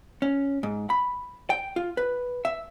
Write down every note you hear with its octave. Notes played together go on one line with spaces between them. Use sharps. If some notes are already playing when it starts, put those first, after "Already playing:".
C#4
G#2
B5
G5
F4
B4
E5